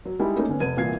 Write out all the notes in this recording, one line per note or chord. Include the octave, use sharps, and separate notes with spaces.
F#3
G3 G#3 D#4 E4 G4
A3 A#3 C#4 D#4
D3 B3 C#4
F1 B4 G#6 D#7
C2 A#2 E3 F5 G#6 C7